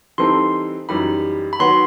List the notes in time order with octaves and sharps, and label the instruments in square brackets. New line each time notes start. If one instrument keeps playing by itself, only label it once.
[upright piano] E3 G3 C4 D#4 A4 [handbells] C6
[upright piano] F#2 E3 G3 D#4 G4 [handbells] B5
[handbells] B5
[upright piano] D#3 F#3 B3 F#4 B4 [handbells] C6